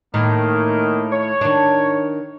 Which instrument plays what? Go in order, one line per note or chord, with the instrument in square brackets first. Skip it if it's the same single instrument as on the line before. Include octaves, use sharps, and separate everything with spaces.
[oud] A2 [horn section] D#3 A#3
[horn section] C#5
[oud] D#3 D4